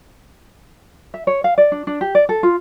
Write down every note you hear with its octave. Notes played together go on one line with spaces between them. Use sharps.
E5
C#5
F5
D5
D4
D4
G4
D5
A4
F4